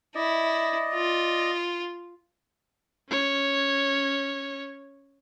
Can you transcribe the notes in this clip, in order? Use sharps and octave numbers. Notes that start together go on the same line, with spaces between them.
E4 D5 D#5
F4
C#4 C#5